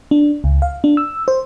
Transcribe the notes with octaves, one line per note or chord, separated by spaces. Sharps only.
D4
C#2
F5
D4
E6
C5